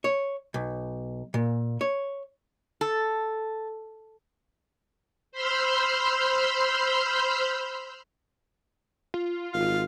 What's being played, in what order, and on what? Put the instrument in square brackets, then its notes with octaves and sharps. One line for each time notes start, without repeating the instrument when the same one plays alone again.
[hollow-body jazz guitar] C#5
B1
A#2
C#5
[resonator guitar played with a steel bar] A4
[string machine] C5 B5 C6 E6 F6 G6
[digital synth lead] F4
[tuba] G#1 [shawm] F5